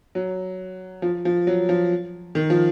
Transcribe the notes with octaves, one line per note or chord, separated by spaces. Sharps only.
F#3
F3
F3
F#3
F3
D#3
F3